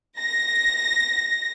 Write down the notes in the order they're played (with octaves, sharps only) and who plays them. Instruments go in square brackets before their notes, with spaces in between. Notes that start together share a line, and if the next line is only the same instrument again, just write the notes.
[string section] A#6